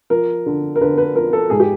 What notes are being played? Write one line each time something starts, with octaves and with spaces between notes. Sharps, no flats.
F3 A#4
D3
A#4
D3 B4
B4
F3 A#4
A4
G#2 G#4
G4